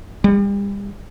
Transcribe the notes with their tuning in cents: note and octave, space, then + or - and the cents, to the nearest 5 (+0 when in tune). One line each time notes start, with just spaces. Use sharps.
G3 +35